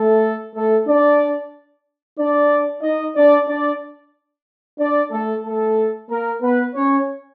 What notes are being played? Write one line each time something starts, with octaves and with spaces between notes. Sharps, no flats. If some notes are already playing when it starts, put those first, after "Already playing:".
Already playing: A3 A4
A3 A4
D4 D5
D4 D5
D#4 D#5
D4 D5
D4 D5
D4 D5
A3 A4
A3 A4
A#3 A#4
B3 B4
C#4 C#5